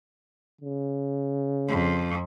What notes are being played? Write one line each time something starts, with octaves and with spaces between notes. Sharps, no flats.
C#3
F2